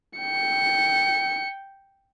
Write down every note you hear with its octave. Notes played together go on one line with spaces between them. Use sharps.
G5 C#7